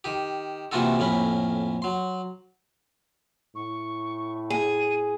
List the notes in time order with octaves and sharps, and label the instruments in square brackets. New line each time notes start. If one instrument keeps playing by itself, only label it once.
[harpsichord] D#3 G4
C3 E3 A#3 F4 F#4 A4
F2 A2 A#3 C#4 B5
F#3 C6
[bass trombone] A2 [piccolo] C#6
[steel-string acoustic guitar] G#4 [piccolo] D#7